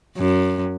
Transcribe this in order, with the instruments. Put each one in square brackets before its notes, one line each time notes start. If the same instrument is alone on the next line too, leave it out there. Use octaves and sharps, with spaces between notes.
[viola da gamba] F#2